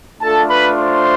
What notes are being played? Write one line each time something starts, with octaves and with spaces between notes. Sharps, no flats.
A3 D4 F4 A4 A5
B4 B5
C5 C6